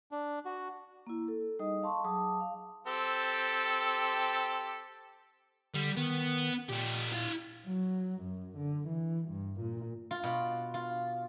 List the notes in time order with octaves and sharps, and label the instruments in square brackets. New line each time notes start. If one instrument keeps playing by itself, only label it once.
[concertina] D4
F#4
[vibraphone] A#3 E4
A4
G3 D#4 G#4 D#5 D#6
F5 A5 C6 C#6
F#3 G#4 A5 D6 D#6
F5
[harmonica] C4 G4 A4
[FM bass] D3 [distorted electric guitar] G3
[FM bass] D#3 [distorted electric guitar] B3
[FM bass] A#2 [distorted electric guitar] A3 G4
[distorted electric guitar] E4 F5
[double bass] F#3
F#2
D3
E3
G2
A#2
[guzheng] F4
B2
F4